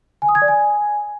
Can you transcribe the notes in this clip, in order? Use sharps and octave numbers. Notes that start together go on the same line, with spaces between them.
G#5
D#6
G#6
D5
G#5